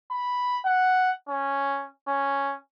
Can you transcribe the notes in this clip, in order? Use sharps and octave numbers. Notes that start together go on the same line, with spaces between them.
B5
F#5
C#4
C#4